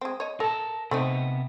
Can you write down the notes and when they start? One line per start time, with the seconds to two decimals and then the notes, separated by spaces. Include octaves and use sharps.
0.01 G#3 C4
0.20 C#5 D#5
0.40 A4 A#4 A5
0.91 C3 A3 B3 C4 D#4